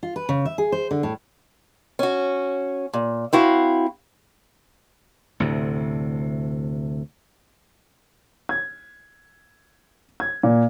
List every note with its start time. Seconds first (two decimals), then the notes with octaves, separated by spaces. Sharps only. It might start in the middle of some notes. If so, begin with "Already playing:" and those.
0.03 F4
0.16 B4
0.29 C#3
0.45 E5
0.58 G#4
0.72 C5
0.91 D3
1.03 A2
1.99 C#4 F#4
2.93 A#2
3.33 C4 E4 F#4 F5
5.40 D2 A2 C3
8.49 G#6
10.20 G#6
10.43 A#2